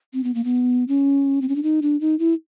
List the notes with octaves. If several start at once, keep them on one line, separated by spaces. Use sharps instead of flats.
C4
B3
A#3
B3
C#4
C4
C#4
D4
D#4
D4
D#4
E4